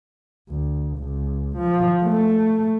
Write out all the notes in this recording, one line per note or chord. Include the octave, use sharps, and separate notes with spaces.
D2
C#2
F3
A3